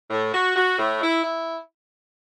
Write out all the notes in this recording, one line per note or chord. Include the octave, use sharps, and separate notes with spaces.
A2
F#4
F#4
A2
E4
E4